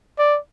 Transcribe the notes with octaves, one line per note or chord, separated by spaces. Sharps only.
D5